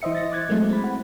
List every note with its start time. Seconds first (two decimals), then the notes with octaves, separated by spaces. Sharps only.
0.02 E3 C5 D#5 E5 C#7
0.15 A6 A#6
0.32 D6 F#6 G#6 A6
0.49 F#3 G#3 A3 C4 E4
0.70 C4 B5
0.84 F#5